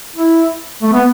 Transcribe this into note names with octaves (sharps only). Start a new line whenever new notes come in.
E4
A3
B3